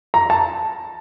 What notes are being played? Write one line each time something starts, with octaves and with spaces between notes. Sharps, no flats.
A#5
A5